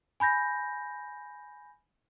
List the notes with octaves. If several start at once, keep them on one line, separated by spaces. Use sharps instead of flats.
G#5 B5 G6 A#6